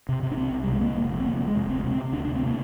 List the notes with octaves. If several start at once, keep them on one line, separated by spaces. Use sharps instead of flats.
C3
C3
D4
C2 C4
C2
C3 G3
G#3
D3 A#3
F1
F2
C4
F1 A#3
D3
G#3
F1
D2 C4
C3
C4
C3
D2 D4
D4
D2
C4
C3 A#3